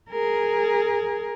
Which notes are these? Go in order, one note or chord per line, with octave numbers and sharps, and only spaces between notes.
G#4 A#4